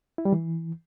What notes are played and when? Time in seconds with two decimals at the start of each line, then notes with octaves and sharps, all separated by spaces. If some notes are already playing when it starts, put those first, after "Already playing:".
0.18 E4
0.25 G3
0.32 E3